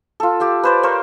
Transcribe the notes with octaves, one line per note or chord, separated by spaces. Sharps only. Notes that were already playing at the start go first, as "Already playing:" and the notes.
F4 A4
G4 F5 G5
B4 C5 D5
A#4 C5 C#5 F5